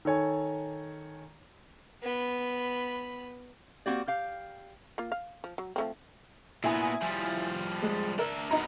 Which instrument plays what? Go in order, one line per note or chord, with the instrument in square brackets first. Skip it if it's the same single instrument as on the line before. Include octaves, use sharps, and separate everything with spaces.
[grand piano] D#3 A4 C#5 G#5
[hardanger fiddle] B3 B5
[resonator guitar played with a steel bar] A#3 C4 F#4 G4 D5
G4 F5
[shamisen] A#3 F4
F5
F3
F#3
F3 A3 C4
[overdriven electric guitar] A#2 B3 [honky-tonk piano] E4 G#5 D#6
[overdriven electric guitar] F3 G3
[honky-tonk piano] G#3
[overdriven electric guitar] D4 E5 [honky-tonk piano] A#4
[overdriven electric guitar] F#2 B3 [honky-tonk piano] D#4 A#5